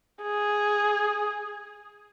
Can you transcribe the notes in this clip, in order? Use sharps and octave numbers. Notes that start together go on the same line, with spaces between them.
G#4